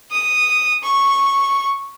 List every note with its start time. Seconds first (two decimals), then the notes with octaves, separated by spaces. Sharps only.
0.12 D#6
0.83 C#6